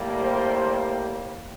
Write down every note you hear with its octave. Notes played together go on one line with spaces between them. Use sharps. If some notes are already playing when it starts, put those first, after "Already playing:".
Already playing: A2 G3 A#3
C5